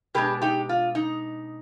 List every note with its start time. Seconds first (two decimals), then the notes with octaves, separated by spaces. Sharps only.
0.14 B2 G#3 D4 G4 B4
0.42 D#4 G4
0.69 F4
0.95 D#4